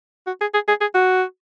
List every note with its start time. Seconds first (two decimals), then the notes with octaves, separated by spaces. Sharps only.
0.27 F#4
0.41 G#4
0.54 G#4
0.68 G#4
0.81 G#4
0.95 F#4